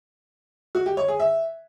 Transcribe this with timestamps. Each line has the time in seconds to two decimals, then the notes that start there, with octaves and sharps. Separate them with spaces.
0.75 F#4
0.86 G4
0.97 C#5
1.08 G#4
1.20 E5